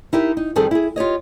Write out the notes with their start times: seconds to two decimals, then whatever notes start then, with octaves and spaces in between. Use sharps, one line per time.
0.13 D#4 E4 G4 A#4
0.37 D#4
0.56 F2 D#3 G3 C4 G#4 A4
0.71 E4 G#4
0.96 F4 G4 C#5 D#5